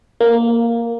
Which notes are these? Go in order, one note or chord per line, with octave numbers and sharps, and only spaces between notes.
A#3